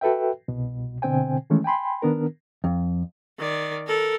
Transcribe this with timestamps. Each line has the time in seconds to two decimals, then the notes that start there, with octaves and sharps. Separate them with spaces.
0.01 F#4 A4 B4 E5 G5
0.48 C2 B2
1.02 B2 D3 C4 C5 G5 G#5
1.50 D#3 E3 G#3 A3 C#4
1.64 G5 G#5 B5 C6
2.02 D#3 B3 D4 A#4
2.64 F2
3.38 D#3 D5
3.87 A4 A#4